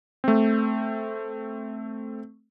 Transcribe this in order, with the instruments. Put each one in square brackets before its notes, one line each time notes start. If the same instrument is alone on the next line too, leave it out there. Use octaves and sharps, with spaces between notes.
[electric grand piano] A3 C4